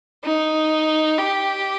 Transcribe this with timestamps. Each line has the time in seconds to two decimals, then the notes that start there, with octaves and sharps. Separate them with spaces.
0.25 D#4
1.18 G4